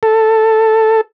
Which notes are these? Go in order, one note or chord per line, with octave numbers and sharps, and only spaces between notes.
A4